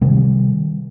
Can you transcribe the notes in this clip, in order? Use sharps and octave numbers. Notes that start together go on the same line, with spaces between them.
C3 D#3 G3